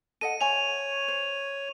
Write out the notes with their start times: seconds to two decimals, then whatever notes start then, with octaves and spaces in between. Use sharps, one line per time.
0.21 A4 D#5 F#5 D#7
0.41 C5 C#5 E5 G#5 F7
1.08 C5